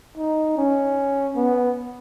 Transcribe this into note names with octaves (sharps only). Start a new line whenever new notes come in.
D#4
C#4
B3